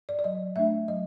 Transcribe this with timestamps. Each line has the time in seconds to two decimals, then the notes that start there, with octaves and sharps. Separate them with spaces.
0.09 D5
0.19 D5
0.24 F#3 D#5
0.56 A3 D4 E5
0.88 F#3 D#5